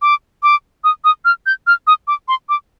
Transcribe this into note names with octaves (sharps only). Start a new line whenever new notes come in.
D6
D6
D#6
D#6
F6
G6
F6
D#6
D6
C6
D6